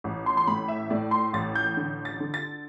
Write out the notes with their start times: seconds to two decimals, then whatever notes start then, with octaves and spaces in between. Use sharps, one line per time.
0.04 A1
0.26 C6
0.37 C6
0.47 A2 B5
0.68 E5
0.90 A2 D5
1.11 C6
1.33 A1 A6
1.55 G6
1.77 D3
2.05 A6
2.20 D3
2.34 A6